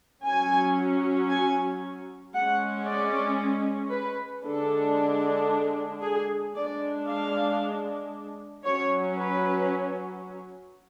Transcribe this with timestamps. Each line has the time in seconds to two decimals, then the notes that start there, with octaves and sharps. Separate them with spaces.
0.24 F#3 C#4 G#5
1.30 G#5
2.34 G#3 C#4 F#5
2.87 D5
3.91 B4
4.44 D3 G#3 D4 A4
6.02 G#4
6.54 G#3 D4 D5
7.07 F5
8.64 F#3 C#4 C#5
9.17 B4